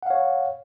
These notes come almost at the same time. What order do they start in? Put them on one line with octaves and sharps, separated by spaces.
F#5 F5 C#5